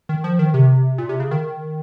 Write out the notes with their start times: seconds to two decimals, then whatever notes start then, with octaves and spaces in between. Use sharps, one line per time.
0.09 D#3
0.24 F3
0.39 D#3
0.54 C3
0.98 A#2
1.09 C3
1.20 C#3
1.31 D#3